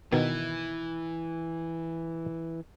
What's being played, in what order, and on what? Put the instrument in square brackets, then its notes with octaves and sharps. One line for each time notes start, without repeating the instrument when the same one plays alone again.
[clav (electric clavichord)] B2 D#3 [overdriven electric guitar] E3